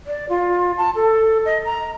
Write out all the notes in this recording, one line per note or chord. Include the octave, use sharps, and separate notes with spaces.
D5
F4
A5
A4
D#5
A#5